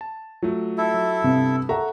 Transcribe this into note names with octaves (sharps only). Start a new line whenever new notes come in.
A5
F#3 A3 F4
E4 A4 E5
F#3
G2 C3 B3
A4 E5 F#5 A#5 C#6